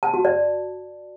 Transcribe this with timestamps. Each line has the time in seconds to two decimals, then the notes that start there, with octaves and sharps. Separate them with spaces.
0.03 A5
0.14 F#4
0.25 D5